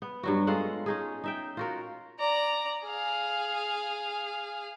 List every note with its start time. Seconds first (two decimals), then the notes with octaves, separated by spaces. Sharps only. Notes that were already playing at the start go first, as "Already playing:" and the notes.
0.02 B3
0.23 G2 F#3 F#4
0.47 G#3 F4 A4 F#5
0.86 C#4 D#4 G#4
1.24 D#4 E5 G5
1.57 F4 F#4 A#4
2.19 D5 A#5
2.84 G#4 F5